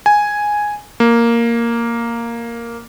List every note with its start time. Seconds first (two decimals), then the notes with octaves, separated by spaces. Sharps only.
0.06 G#5
1.00 A#3